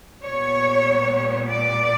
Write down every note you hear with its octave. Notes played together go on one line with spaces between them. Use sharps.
A#2 G3 B3 C#5
D5